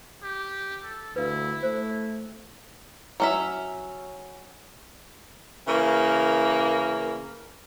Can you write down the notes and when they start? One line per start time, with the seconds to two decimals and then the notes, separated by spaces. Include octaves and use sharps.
0.22 G4
0.84 A4
1.16 D2 E4 B4 F5
1.63 A3 C5
3.20 F#3 C#4 E5
5.67 C#3 E3 A#3 A#4